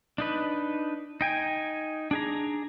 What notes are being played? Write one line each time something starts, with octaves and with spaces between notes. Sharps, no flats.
D4 D#4 B4
D#4 G5 G#5
D4 G#4 A#5